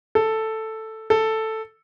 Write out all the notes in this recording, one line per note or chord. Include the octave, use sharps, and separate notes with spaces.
A4
A4